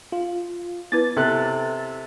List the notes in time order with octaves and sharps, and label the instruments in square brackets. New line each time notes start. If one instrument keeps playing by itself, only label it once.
[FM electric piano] F4
[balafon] B3 E4 B4 [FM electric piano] A6
[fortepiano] C3 A4 F#6